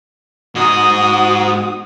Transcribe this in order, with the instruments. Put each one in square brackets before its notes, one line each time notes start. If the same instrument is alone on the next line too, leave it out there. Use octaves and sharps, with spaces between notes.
[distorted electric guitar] G#2 D#5 [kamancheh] F#4 D#6